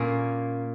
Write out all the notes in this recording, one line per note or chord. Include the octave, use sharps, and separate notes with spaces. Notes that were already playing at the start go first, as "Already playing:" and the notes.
Already playing: A#2 A#3 C#4 A#4